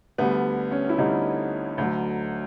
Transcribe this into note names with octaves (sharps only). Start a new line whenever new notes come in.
D2 D3 G3 B3
C#4
E4
D2 D3 G3 D#4
D2 D3 F#3